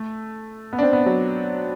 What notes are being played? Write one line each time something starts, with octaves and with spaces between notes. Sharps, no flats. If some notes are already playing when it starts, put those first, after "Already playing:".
Already playing: A3
B3
D4
C4
B3
F#3